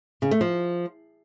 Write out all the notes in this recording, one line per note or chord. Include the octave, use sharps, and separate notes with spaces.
C#3
A3
F3